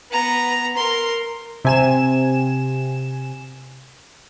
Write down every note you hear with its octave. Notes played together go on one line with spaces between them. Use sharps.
B3 A#5
A#4 C6
C3 G#5 E7